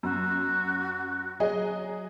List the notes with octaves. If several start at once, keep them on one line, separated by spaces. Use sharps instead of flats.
F#2 F#4
F#3 G#4 D#5